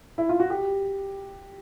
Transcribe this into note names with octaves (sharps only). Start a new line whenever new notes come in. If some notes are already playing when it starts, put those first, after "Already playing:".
E4
F4
F#4
G4